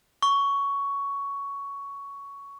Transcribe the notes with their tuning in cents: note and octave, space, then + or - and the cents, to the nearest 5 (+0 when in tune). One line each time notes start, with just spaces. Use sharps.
C#6 +10